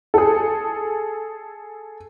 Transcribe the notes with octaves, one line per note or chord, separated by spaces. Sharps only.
G#4 A4